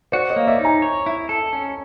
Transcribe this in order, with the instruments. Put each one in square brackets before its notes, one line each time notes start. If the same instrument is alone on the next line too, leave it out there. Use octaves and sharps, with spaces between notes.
[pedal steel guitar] F#4 [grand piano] C5 D5
[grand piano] C#5 D#5
[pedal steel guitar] A#3
[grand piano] D5 E5
[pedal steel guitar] D#4
[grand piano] G#5 A#5
[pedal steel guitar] C#5
E4
A4
C#4